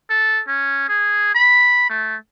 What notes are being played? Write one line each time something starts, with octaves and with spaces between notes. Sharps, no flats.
A4
C#4
G#4
B5
A3